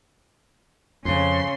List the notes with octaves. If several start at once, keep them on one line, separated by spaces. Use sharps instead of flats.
F2 C#3 C6